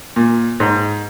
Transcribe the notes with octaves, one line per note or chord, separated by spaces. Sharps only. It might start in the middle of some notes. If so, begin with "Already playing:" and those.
A#2
G#2